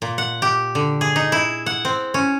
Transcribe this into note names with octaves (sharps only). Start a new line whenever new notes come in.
A#2
F#5
G4
D3
G#4
D#4
E4
F#5
C4
C#4